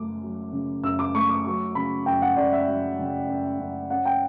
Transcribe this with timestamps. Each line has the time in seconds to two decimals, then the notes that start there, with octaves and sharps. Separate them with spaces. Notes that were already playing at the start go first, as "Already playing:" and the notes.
Already playing: F#2 C#3 A3 D6
0.22 F#3
0.52 C#3
0.83 F#2 E6
0.99 D6
1.14 A3 C#6
1.30 D6
1.44 F#3 C#6
1.75 C#3 B5
2.06 F#2 G5
2.22 F#5
2.36 F#2 D5
2.53 E5
2.67 F#3
2.99 C#3
3.28 F#2
3.59 F#2
3.90 C#4 F#5
4.05 G5